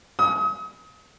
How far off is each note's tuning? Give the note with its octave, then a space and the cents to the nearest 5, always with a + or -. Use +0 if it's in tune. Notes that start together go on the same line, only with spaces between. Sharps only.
D#6 +35